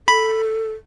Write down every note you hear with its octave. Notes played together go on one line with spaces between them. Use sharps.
A4 B5